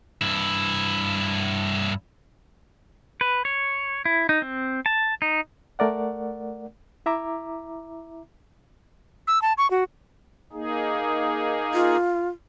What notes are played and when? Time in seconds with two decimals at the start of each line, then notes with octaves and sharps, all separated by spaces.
0.21 G2 E4
3.21 B4
3.45 C#5
4.05 E4
4.29 D#4
4.42 C4
4.86 A5
5.22 D#4
5.79 A3 A#4 D5 F#5
7.06 E4 E5 A#5 D6
9.27 E6
9.42 A5
9.58 C#6
9.71 F#4
10.53 A#3 D#4 G#4
11.74 F4